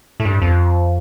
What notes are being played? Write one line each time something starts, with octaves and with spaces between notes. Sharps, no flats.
A2
G2
F2